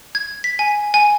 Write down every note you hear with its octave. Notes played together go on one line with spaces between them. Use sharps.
G#6
B6
G#5
G#5